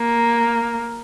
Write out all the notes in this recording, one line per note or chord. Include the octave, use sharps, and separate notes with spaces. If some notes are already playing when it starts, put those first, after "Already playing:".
Already playing: A#3